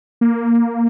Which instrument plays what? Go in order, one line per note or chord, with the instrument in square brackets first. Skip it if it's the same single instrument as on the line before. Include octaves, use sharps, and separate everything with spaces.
[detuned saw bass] A#3